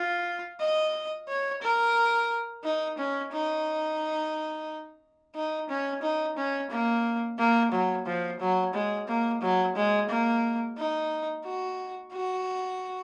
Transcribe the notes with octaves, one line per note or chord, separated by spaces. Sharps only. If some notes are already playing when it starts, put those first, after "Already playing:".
Already playing: F4
D#5
C#5
A#4
D#4
C#4
D#4
D#4
C#4
D#4
C#4
A#3
A#3
F#3
F3
F#3
G#3
A#3
F#3
G#3
A#3
D#4
F#4
F#4